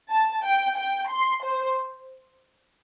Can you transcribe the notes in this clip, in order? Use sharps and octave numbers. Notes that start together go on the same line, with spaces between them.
A5
G5
G5
C6
C5